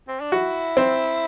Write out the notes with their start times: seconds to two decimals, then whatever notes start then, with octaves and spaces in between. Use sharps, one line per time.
0.08 C4
0.21 D4
0.32 E4 F#4
0.77 C4